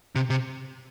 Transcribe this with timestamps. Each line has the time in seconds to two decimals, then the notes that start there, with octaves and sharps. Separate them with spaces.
0.16 C3
0.30 C3